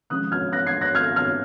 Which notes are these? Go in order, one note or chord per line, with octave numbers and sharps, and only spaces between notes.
C3 F3 G#3 C#4 D#6 F#6
F6 G#6
F#6 A#6
G#6 C7
F#6 A#6
F6 G#6
F6 G#6